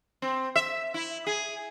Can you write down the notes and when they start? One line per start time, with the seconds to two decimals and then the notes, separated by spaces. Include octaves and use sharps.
0.22 C4
0.56 E5
0.94 E4
1.27 G#4